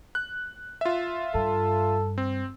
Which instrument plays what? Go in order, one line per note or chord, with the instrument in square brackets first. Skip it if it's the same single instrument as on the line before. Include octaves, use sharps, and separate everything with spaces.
[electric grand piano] F#6
F4 E5
[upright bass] G2 [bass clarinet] A4
[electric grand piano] C4